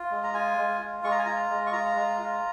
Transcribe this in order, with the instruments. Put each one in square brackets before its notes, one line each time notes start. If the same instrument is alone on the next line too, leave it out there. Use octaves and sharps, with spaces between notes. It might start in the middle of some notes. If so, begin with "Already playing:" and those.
Already playing: [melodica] F4
G#3
A#5
F4 G#5
G#3
F4
G#3 C#6
A#5
G#5
F4 A#5
G#3
C#6
F4 A#5
G#3
F4